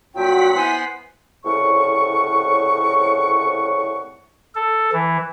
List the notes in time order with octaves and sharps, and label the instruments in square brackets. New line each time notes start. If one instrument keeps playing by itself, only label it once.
[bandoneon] G2 A#2 F#3 [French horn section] F4 F#4 [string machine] F#5 B6 [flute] G5
[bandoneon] B3 C5 C6 [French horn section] E4 [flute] G#5
[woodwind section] C2 F2 A2 C#3 F#5 C#6
[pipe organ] A4
E3